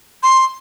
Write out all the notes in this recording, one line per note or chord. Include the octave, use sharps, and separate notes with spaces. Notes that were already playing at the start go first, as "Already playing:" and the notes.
C6